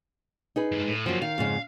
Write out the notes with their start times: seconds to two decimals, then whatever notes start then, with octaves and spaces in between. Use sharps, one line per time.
0.56 D#4 G#4 B4
0.72 G2 G#3
0.87 A2
1.06 F#2 F3 A#3 F#4
1.22 D#3 F5
1.38 F2 G#2 C#3